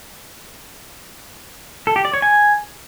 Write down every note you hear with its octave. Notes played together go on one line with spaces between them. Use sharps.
A4
G4
D5
C#5
G#5